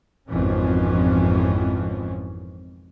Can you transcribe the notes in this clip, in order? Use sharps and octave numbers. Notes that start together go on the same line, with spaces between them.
G#1 F2 B2 E3 F3 C#4